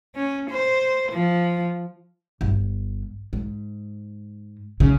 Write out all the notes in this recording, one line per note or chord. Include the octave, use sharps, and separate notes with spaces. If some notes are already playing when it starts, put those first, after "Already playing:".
C#4
C5
F3
G1
G#2
C#3